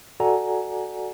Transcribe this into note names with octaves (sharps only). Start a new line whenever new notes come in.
F#4 A4 D5 F#5 G#5 A#5